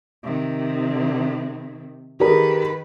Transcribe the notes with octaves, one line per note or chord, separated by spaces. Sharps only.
C3 D#3
D#3 G4 G#4 A#4 B4